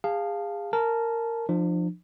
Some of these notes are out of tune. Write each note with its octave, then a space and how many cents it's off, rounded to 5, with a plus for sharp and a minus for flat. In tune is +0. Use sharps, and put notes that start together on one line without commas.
G#4 -30 F5 +0 A5 +0
A#4 -15 A5 -25
F3 +0 D4 +40